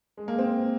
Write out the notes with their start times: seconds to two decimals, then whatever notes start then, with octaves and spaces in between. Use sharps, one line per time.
0.17 G#3
0.28 A#3
0.38 C4